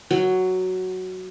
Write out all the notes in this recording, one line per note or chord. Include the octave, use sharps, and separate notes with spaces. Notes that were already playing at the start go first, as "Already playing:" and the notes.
F#3